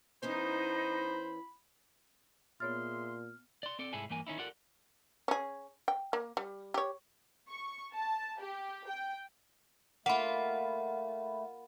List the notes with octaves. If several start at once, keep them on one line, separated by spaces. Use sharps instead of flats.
E3 B3 C#4 D#4 C5 B5
A#2 B3 G#4 C#5 E5 C6 F6 A6
D5 C6
C4 A4 D5
C2 G#2 E4 G#4 A4 G#5
G2 E3 A#3 A#4 G#5
D#3 C#4 D#4 E4
F4 G4 A4 A#4 D5 F#5
C#4 G#4
G5
A#3
G3
G4 C#5
C#6
A5
G4
G5
A3 A#3 F4 F#5 B5